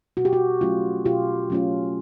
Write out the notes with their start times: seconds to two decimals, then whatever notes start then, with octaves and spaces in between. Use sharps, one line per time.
0.17 B2 F#4
0.25 G4
0.33 F#4
0.61 F#3 A3 C#4 F4
1.05 B2 F4 G4
1.50 F#3 A3 C#4 F4